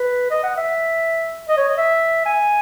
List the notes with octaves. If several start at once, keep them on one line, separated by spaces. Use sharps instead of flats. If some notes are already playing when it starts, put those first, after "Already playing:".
Already playing: B4
D#5
F#5
E5
D#5
C#5
D#5
E5
G#5